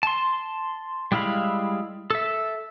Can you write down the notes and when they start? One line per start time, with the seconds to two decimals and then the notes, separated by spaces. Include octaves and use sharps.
0.03 A5 C6
1.12 G3 G#3 E4 F5 B5
2.10 A4 E5